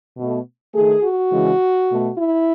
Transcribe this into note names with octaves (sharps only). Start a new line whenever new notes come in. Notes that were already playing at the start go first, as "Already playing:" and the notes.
B2 A3
D#3 A3 G#4
F#4
C#3 E3 G#3
B2 A3
E4